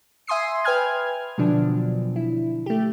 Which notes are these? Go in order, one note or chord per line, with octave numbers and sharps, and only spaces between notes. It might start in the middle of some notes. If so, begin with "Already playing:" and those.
E5 G#5 C6 D#6 C7
B4 G5 G#5 F6 G#6
B2 D3 F3 F#3 D4
E4
A3 G4